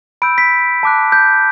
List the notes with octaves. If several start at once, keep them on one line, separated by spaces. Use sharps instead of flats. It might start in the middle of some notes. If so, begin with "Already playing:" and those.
B5 E6 G6 D7
B6
A5 D6 F#6
G6